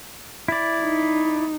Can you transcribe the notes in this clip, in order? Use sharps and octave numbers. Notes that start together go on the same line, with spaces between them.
E4 D5
D#4